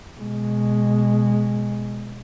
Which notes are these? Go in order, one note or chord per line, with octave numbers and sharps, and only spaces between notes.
B2 G#3